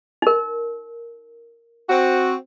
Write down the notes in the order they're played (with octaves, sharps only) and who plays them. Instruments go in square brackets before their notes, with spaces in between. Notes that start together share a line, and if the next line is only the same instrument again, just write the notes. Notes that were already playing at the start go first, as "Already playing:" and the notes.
[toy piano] D#4 A#4
[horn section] C4 F#4